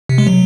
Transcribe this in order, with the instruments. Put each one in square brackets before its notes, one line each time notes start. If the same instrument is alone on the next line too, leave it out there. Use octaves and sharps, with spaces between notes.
[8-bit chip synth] C3
G#3
F#3